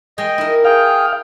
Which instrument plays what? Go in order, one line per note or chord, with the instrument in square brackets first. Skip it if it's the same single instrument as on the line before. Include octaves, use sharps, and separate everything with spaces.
[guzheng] G#3 G5 [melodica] D#5
[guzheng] E4 A#4
[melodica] G#4 G5 [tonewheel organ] F5